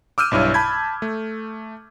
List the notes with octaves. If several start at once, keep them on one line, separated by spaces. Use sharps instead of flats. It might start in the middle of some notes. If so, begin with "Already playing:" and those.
D6 E6 F6 G6 D#7
B1 G2 E4 C#5
A5 B5 G6 G#6
A3